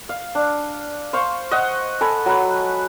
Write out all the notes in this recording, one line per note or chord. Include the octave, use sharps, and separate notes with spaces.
F5
D4
C5 F5 C#6
D#5 F#5
A4 G#5 B5
F#3 B4